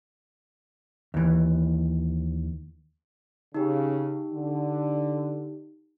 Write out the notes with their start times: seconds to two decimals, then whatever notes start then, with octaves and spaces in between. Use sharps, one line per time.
1.14 D#2 E3
3.54 C#3 D#4 G4
4.33 D3